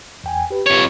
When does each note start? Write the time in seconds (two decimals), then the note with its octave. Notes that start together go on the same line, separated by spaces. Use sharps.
0.24 E2 G5 G#5
0.50 G4 B4
0.67 F2 C#5